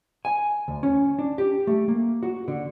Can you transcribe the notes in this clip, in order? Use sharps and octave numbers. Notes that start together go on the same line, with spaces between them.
G#5
D2
C#4
D4
G4
A3
A#3
F#4
D3